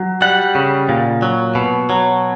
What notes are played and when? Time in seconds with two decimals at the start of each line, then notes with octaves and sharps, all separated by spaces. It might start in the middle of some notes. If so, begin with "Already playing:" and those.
Already playing: F#3
0.22 G3 F#5
0.55 C#3
0.89 A#2
1.22 F#3
1.55 B2
1.90 F#3